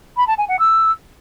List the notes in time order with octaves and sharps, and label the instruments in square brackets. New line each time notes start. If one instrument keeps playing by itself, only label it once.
[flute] B5
A5
G#5
F#5
E6